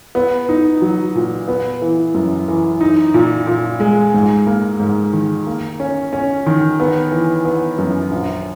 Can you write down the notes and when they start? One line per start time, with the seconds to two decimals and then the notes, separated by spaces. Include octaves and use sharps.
0.15 B3
0.49 D#4
0.82 F#3
1.15 A#2
1.48 B3
1.82 E3
2.14 F#2
2.48 E3
2.81 D#4
3.14 A#2
3.47 A#2
3.80 G#3
4.14 G#2
4.47 A#3
4.79 G#2
5.13 D#3
5.47 A#3
5.80 C#4
6.13 C#4
6.46 D#3
6.80 B3
7.12 E3
7.45 B3
7.78 F#2
8.11 A#1